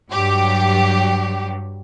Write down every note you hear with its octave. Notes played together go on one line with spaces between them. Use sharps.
G2 F#3 G4